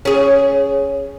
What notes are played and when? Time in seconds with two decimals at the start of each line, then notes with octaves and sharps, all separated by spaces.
0.05 C#4 G#4